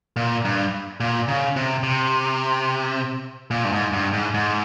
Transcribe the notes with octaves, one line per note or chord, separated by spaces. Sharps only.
A#2
G2
A#2
C#3
C3
C3
A#2
G2
G#2
G2
G#2
G#2